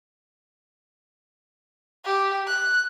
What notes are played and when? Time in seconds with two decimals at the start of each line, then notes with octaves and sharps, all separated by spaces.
2.05 G4
2.47 F#6